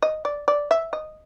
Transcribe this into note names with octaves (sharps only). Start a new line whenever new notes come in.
D#5
D5
D5
E5
D#5